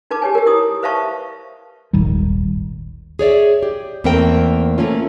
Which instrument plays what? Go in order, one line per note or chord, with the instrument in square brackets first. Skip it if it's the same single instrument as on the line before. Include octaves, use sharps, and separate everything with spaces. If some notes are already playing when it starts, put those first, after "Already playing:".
[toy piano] D#4 B4 A5 D6
G4 C#5 G#5
G4 A#4
E4 D#6
B4 C5 E5 F5 A5 C#6
[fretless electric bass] D#1 G#1 D#3 G3
[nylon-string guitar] G#4 C#5 D5 E5
G4
E2 A3 A#3 C4 A#4 G5
A3 A#3 C#4 F4